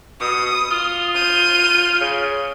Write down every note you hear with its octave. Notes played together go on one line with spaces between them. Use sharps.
B2 D#6
F4
G6 D#7
C#3